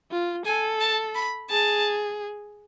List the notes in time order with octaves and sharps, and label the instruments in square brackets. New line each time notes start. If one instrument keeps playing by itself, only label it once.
[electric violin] F4
[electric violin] A4 [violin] G#5
[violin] A5
B5
[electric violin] G#4 [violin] A5